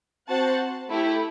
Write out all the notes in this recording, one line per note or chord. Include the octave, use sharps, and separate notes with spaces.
C4 F#4 C5 F#5 A5
A3 E4 G4